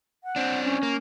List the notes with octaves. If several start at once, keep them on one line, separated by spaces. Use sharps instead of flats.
F#5
C4 D4
C#4
A#3